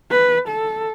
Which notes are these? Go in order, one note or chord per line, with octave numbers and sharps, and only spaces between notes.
B4
A4